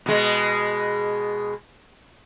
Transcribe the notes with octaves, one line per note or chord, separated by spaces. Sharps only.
B2 G#3